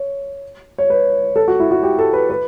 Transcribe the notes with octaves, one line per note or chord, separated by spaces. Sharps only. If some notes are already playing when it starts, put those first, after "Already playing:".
Already playing: C#5
C#5
B4
A4
F#4
E4
F#4
G4
A4
B4
B4